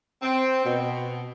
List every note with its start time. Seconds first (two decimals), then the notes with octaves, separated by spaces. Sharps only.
0.22 C4
0.64 B2